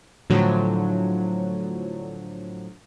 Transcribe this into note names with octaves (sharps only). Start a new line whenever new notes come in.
A2 D3 F3 F#3